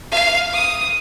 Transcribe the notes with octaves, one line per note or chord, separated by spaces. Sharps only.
F5
D#6